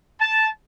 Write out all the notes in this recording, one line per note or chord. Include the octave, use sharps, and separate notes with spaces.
A5